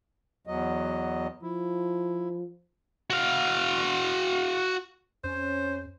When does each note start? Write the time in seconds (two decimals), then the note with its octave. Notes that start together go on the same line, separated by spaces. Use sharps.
0.47 E2 F#3 D#5
1.43 F3 E4
3.10 F#4 F5
5.24 F2 C#4 C5